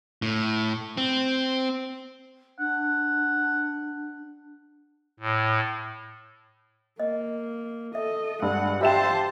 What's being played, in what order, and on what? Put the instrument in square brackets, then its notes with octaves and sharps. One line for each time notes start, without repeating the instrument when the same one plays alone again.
[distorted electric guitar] A2
C4
[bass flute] D4 [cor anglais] F#5
[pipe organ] A2
[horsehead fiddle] A#3 [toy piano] D#5
[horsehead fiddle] A4 D#5 [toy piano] E5
[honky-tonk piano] G2 [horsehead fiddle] G#3 F#5
[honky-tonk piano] G4 E5 E7 [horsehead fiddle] C5 A5 [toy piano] F5 G5